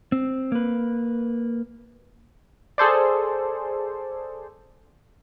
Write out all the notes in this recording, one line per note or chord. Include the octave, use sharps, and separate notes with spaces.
C4
A#3 B4
G#4 A4 C5 D5